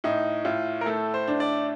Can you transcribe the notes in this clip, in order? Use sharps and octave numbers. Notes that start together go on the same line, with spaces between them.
A2 D#4
A2 F4
A#4
A3 A4
C5
D4
D5